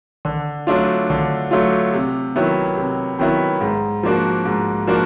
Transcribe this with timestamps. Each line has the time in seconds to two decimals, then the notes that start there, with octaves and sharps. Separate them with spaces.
0.25 D3
0.67 F#3 A3 D4 F4
1.10 D3
1.51 F#3 A3 D4 F4
1.93 C3
2.36 D#3 F#3 B3 E4
2.77 C3
3.19 D#3 F#3 B3 E4
3.61 G#2
4.03 F3 A#3 D4 F#4
4.45 G#2
4.87 F3 A#3 D4 F#4